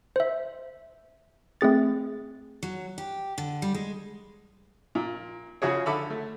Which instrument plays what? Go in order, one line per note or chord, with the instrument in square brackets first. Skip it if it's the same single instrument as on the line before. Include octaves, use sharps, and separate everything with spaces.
[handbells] C5 E5
A3 C4 G#4 A6
[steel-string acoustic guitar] F#3
G4
D3
G3
G#3
[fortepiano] A#2
C#3 F3 E4 F#4 G#4 C#5
D3 A4 E5 B5
A3